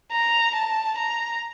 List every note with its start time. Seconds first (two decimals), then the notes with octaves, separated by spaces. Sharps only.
0.12 A#5
0.55 A5
0.97 A#5